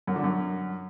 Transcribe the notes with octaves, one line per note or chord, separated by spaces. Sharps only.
F#2
D3
F#2